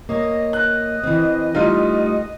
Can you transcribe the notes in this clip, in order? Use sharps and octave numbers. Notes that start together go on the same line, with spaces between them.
A#3 C#5 D#5
F#6
E3 C4
G3 A3 D#4 F4